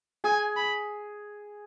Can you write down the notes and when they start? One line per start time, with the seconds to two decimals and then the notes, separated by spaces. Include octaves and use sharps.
0.24 G#4 G#5
0.57 B5